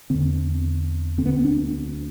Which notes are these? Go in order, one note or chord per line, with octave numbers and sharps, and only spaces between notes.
E2 D3 C4
D2 D3 C4
B3
C4
D4